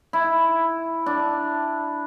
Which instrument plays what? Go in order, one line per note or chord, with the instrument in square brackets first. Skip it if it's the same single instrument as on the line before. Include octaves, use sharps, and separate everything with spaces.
[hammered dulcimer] E4
D4